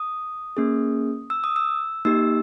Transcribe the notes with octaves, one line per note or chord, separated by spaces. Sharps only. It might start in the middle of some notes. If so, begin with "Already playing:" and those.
Already playing: D#6
A#3 C#4 G#4
E6
D#6
E6
A#3 D#4 G4 E6